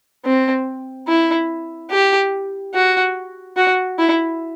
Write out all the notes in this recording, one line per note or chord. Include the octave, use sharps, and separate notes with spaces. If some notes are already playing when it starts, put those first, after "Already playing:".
C4
E4
G4
F#4
F#4
E4